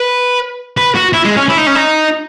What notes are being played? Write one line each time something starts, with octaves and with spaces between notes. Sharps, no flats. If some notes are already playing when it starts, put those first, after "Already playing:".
Already playing: B4
B4
F#4
E4
G#3
C#4
E4
D#4
C#4
D#4